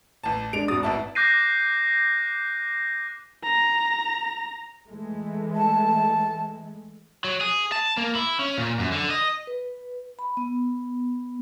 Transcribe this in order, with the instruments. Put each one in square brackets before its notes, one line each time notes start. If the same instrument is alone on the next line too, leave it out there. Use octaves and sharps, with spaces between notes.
[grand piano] A1 A5
[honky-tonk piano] G#3 D4 [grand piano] D7 F7
[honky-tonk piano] G#1 F#4 A6 [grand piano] D#6
[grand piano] A1 E4 A5
[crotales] D6 F#6 G6 A#6 C7 D#7
[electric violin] A#5
[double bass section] E3 G#3 A3
[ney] A5
[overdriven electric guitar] F#3
G#4
A5
A#3
E4
C#4
A#2
F#2
D3
D#5
[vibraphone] B4
B5
B3